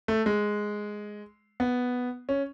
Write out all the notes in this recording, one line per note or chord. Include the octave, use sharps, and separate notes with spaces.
A3
G#3
B3
C#4